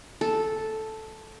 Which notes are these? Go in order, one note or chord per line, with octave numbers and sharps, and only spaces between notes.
A4